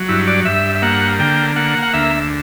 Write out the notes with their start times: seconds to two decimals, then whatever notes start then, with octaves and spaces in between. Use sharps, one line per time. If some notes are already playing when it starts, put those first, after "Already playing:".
Already playing: F#3
0.09 G2 E4
0.27 D5
0.45 G2 E5
0.75 E5
0.82 A#3 F#5
1.19 D3 G5
1.56 A#3 F#5
1.82 F#5
1.93 D2 E5